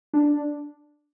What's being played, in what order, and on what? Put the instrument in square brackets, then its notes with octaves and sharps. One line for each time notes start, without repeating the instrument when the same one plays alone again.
[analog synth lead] D4